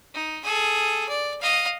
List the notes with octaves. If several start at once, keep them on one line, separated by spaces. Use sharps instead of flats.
D#4
G#4 A4
D5
D#5 F5